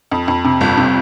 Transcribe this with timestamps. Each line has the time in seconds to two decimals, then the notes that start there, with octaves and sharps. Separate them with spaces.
0.12 F2
0.28 F2
0.44 C3
0.61 G1
0.77 C3